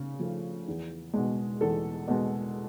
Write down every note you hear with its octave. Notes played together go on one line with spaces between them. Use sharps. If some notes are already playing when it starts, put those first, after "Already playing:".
Already playing: C#3
F3 A3
E2
B2 G#3
E2 A4
B2 G#3